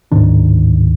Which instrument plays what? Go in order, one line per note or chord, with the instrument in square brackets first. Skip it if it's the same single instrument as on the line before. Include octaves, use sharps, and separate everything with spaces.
[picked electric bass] D1 G#2 D#3 D4